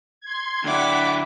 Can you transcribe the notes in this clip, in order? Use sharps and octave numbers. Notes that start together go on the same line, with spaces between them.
C6 G#6
D2 D4 E4 F#5 G5 D6 B6